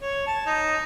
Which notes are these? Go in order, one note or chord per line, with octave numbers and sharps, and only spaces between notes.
C#5
A5
D#4